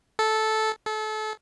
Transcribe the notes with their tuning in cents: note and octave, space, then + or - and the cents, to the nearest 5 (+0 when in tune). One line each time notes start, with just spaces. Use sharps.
A4 -10
A4 -30